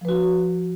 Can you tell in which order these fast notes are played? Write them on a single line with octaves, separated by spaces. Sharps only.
F3 B4 F#4